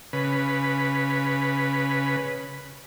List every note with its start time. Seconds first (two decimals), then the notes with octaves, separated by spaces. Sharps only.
0.13 C#3 B4